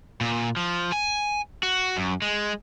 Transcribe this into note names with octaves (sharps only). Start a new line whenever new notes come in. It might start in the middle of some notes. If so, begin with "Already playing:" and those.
A#2
F3
G#5
F#4
F#2
G#3